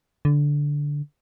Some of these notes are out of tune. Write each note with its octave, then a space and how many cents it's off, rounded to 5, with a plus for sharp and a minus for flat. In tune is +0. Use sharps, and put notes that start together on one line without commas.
D3 -10